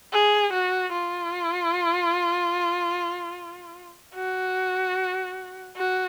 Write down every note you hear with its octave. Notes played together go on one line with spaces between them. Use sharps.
G#4
F#4
F4
F#4
F#4